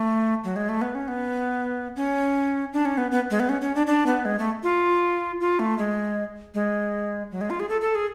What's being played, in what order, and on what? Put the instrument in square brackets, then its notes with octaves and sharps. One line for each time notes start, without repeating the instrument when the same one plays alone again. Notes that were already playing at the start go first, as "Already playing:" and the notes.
Already playing: [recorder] A3
F#3
G#3
A3
B3
C#4
B3
C#4
D4
C#4
B3
B3
G#3
B3
C#4
C#4
D4
D4
B3
G#3
A3
F4
F4
A3
G#3
G#3
F#3
G#3
F4
G#4
A4
A4
G#4